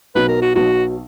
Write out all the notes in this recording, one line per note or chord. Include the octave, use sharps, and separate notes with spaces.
B1 B2 F#3 B3 B4
A#4
F#4
B1 B2 F#3 B3 F#4